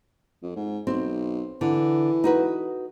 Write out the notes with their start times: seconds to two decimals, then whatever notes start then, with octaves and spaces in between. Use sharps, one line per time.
0.43 F2
0.56 G#2
0.87 B1 C4
1.61 D3 E3
2.24 D#4 F#4 B4